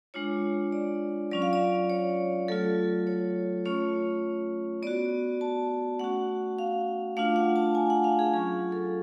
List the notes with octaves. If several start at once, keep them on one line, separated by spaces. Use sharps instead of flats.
G#3 D4 F4 C#5
D5
F#3 C#4 F4 D5
F5
D5
C#5
F#3 A3 F4 A4
C#5
A3 C#4 F4 C#5
B3 F#4 D5
A5
A3 C#4 F#4 F#5
F5
A3 D4 F4 F5
F#5
A5
G#5
F#5
F5
G#4
F#3 C#4 F4 G#4
A4